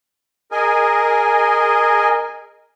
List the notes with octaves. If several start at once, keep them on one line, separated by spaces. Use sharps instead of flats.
G#4 A#4 D#5 G#5